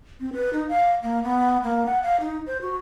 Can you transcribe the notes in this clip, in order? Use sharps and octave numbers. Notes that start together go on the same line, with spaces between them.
C4
B4
D#4
F5
A#3
B3
A#3
F#5
F5
D#4
C5
F#4